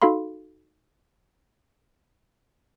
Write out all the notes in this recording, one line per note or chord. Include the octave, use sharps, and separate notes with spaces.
D#4 F#4 A4 F5 B5 C6